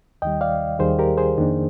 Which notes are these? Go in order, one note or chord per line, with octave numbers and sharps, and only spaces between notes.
D#2 D#3 G3 D#5 G5
D5 F5
D#2 D#3 G3 G#4 C5
G4 A#4
G#4 C5
F2 D#3 A#3 D4